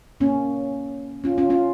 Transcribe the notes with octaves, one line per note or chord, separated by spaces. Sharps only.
A#3 C#4
C#4 F4
C#4 F4
C#4 F4